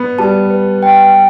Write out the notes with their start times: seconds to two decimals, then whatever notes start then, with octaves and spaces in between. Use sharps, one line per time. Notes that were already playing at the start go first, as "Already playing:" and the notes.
Already playing: B3 B4
0.18 G3 A5
0.50 B4
0.83 G5